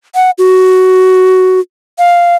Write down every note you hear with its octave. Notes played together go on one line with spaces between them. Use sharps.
F#5
F#4
F5